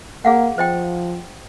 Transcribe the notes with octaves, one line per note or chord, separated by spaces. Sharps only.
A#3 G#4 F5 F#5
F3 C5 D#5 G5